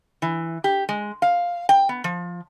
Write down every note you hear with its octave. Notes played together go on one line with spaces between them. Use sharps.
E3
G4
G#3
F5
G5
B3
F3